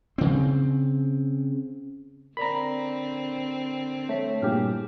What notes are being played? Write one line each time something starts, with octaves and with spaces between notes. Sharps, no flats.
C#3 C4
D3 C4 A#4 D5 A#5 B5
A3 C#5 B6
G2 A#2 E4 G4 G#4 F6